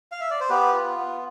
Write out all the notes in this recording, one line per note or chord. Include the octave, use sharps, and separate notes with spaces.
F5
E5
D5
C5
B3 G4 B4
F4
B3